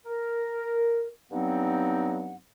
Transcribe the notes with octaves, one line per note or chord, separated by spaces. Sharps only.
A#4
G2 F#3 B3 C4 D#4 F#5